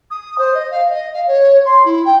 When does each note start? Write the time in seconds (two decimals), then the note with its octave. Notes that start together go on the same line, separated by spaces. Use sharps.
0.10 D#6
0.38 C5
0.54 D#5
0.71 F5
0.90 D#5
1.13 F5
1.27 C#5
1.65 C6
1.85 E4
2.05 G5